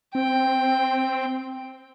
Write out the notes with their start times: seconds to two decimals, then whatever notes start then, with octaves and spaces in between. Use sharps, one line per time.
0.15 C4 G5